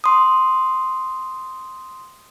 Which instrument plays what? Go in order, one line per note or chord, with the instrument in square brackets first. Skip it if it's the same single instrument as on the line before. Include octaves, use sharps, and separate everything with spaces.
[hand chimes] C6 D#6